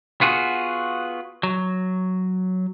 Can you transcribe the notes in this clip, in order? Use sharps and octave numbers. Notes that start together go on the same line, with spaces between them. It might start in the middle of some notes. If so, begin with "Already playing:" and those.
B3 F4 F#4 G#4
F#3